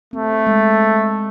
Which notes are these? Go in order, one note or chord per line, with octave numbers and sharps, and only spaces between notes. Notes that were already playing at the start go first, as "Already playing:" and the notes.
A3 C4
G#3